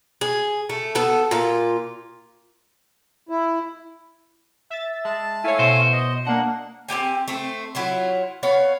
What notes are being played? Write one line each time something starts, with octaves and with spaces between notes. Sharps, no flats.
G#4
A3
B3 A4
A#2 F4
E4
E5 A6
G#3 A5
A3 E4 C#5 F5 G#5
B2 F#4 C5
D#5
A#3 D4 F#5
C4 C#4 G4 G#5
A3 C4 C5
F#3 E4 F4
B3 C#5 F5